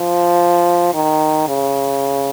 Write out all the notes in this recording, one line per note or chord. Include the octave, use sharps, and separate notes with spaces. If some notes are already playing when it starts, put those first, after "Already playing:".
Already playing: F3
D#3
C#3